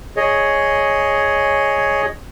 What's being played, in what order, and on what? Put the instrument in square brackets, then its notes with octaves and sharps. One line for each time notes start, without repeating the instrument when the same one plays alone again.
[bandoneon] G#4 C#5 D#5